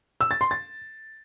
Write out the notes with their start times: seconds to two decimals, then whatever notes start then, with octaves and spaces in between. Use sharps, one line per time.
0.21 E6
0.31 A6
0.41 C6
0.51 A6